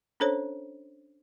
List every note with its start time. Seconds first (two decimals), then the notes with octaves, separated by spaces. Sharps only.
0.20 C#4 D4 A4 C5 C#5